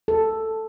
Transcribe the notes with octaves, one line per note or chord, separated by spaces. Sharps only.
A4